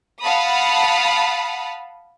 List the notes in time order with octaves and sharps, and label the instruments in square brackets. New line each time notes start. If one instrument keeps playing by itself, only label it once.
[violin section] F5 F#5 A5 B5 D#6